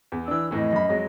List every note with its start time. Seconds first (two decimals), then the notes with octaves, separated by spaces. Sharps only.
0.12 E2
0.28 E3 D4 E6
0.51 F2 A2 E3 D#5
0.73 F#2 B5
0.88 F2 F#3 G#3